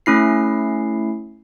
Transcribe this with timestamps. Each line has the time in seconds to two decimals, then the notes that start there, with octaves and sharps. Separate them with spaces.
0.06 A3 C#4 E4 C7